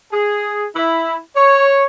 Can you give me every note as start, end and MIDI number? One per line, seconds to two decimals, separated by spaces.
0.13 0.65 68
0.76 1.16 64
1.36 1.86 73